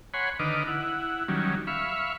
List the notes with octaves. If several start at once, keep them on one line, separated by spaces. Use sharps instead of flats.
C#5 F#5 G#5 B5 C6
D3 D#3 B4 D#5 D6 F6
E4 F#5
D#3 F#3 G3 C#4
E5 F5 B5 C#6